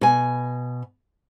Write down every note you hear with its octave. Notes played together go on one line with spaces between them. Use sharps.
B2 G#5